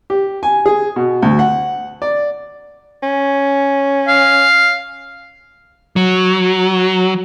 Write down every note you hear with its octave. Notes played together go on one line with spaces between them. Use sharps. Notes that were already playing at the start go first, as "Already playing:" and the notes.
G4
G#5
G#4
B2
D2
F#5
D5
C#4
F5
F#3